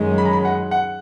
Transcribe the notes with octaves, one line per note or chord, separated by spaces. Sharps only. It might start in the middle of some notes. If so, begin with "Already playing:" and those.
Already playing: F#2 D#3 G#3 C#4
B5
A#5
B5
F#5
F#5